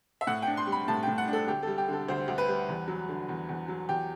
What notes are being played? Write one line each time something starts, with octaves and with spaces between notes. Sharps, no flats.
E5
A2 F#5
D4 G5
C6
G3
B5
A2 A5
A2 G5
F#5
D4
A4
D2 G4
G3 A4
G4
D3 A4
D2 C5
D2
B4
G3
E2
F#3
D3
E2
E2
F#3
E2 G4